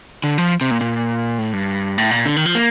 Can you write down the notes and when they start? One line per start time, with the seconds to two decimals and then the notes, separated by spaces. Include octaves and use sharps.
0.24 D3
0.38 F3
0.61 C3
0.71 A#2
0.81 A#2
1.39 A2
1.53 G2
1.98 A2
2.11 A#2
2.26 D3
2.36 D#3
2.46 F3
2.55 A#3